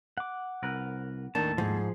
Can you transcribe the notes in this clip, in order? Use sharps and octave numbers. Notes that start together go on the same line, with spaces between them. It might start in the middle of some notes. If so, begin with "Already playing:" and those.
F#5 D6
C2 A#4 B4
D#2 A2 D#3 D4 A5
G#2 F3 G#4